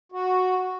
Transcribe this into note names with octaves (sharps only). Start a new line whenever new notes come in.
F#4